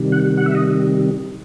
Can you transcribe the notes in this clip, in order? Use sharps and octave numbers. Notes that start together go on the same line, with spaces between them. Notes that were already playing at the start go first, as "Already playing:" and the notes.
Already playing: C3 D#3 G3
F#5
F#5
E5
D#5